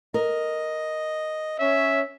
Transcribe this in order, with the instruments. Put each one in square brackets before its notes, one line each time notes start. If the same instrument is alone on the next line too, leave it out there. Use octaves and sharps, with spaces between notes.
[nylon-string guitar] A#4 [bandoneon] D#5
[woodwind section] C#4 C#5 [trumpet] E5